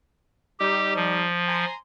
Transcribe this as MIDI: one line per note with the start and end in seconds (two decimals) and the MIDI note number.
0.59 1.26 55
0.59 1.26 63
0.59 0.94 67
0.96 1.65 53
1.48 1.74 80
1.48 1.74 82
1.48 1.74 84